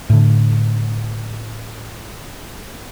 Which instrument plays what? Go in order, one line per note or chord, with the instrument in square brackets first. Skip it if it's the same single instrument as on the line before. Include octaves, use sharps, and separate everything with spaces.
[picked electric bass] A2 D3